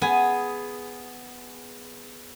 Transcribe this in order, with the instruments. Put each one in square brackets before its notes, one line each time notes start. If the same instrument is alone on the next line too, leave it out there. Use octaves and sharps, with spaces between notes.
[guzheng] B3 G#4 G#5